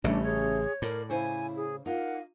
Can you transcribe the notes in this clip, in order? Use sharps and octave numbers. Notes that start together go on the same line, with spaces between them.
A1 C#3 G3 A3 C#4 D4
G#4 C#5
A2 A#4 D5
C#3 E4 C5 C#5 G#5
G#4
D#4 F4 A#4 F#5